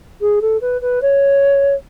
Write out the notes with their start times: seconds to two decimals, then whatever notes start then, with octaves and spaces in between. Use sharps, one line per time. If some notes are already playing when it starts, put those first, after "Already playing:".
0.21 G#4
0.42 A4
0.61 B4
0.81 B4
1.02 C#5